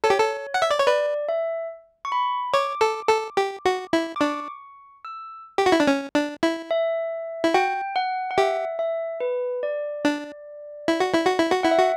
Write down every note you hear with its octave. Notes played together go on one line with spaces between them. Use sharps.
A4 C#5
G4
A4
F#5
E5
D5
C#5
B4 D5
E5
C#6
B5
C#5 D6
A4
A4
G4
F#4
E4
D6
D4 C#6
E6
G4
F#4
E4
D4
C#4
D4
E4
E5
E4
F#4 G5
F#5
F#5
G4 E5
E5
B4
D5
D4
E4
F#4
E4
F#4
E4
F#4
E4 F#5
E5
F#4